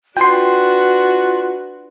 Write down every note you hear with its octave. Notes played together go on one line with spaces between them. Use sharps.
D4 F4 F#4 B4 G5 C6